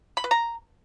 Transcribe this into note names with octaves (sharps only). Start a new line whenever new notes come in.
B5
B4
A#5